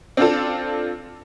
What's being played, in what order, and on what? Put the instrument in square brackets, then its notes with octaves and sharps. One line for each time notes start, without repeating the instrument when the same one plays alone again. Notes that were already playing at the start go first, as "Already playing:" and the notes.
[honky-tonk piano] C4 D4 F4 A4